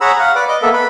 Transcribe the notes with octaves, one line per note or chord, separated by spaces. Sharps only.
G#4 C#5 F#5 A#5 B5 E6
F5 F#5
B4 D5 D6
D#5 D6
A#3 B3 A4 E5
B4 B5